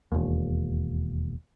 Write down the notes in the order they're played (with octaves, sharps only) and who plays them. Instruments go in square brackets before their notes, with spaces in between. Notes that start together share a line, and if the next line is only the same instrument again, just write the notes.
[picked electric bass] E1 D#2